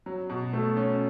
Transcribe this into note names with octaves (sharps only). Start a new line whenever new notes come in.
F#3
B2
A3
C#4